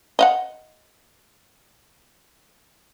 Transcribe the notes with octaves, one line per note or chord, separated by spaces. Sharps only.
D#5 F5 F#5